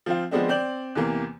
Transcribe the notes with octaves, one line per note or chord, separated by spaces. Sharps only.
F3 C4 F4
F3 G#3 B3 C4 D4
C4 D5 G6 F#7
E2 C3 E3 A#3